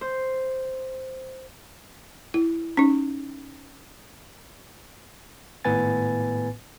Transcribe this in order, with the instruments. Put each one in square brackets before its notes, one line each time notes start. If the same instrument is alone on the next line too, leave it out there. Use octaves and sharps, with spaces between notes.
[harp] C5
[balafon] E4
C#4 D#4
[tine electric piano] G#1 A2 B3 B4 G#5 A6